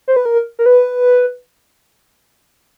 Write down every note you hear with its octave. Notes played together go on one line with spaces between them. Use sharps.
C5
B4
A#4
A#4
B4